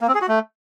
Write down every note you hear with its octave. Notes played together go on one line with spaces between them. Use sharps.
A#3
C4
G#4
F#4
A3